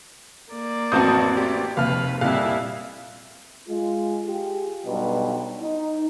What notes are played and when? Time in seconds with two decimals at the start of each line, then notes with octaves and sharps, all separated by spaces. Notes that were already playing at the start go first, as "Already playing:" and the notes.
0.52 A#3 D5
0.92 A1 F2 F#3 C4 F#4 A5 D#6 G6
1.37 G4
1.77 F1 D#2 B4 F5 F6
2.21 F2 A#2 G3 E4 F5 F#6
3.69 G#3 F4
4.26 F4 G4 G#4
4.86 B1 G2 B2
5.62 D#4